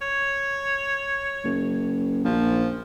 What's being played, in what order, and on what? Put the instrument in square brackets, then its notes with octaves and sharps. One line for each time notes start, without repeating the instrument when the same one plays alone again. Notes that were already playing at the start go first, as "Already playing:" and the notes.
[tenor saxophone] C#5
[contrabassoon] F#1
[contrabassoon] A#1 [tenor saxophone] F3